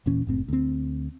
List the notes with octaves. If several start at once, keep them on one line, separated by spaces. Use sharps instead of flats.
D#1 A#2 E3 C#4
F#1 A2 C4
D2 C4